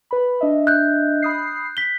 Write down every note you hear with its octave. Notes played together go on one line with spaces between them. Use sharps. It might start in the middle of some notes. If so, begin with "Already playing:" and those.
B4 B5
D4 D#5 E5
F#6 G6
B5 D#6 C7
B6 G7